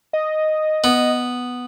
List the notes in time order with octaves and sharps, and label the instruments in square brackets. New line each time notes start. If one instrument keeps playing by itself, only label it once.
[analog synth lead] D#5
[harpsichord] B3